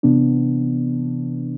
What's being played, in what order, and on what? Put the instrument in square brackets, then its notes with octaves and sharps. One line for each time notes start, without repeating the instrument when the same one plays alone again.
[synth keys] C3 E3 B3 D4